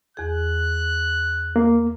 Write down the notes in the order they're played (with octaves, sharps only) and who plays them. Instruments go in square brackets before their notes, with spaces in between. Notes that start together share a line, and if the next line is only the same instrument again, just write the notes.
[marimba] E2 G#4 [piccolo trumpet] F#6
[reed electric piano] A#3